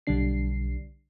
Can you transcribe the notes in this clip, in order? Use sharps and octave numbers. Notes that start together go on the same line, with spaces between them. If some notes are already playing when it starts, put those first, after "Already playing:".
B1 D3 G3 D4 C7